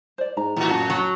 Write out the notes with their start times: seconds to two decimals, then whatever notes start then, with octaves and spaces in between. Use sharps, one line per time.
0.18 C5 D5
0.37 G#2 A#5
0.56 A2 E3 F#4
0.70 F#2 F#5 A5 A#5
0.90 F#3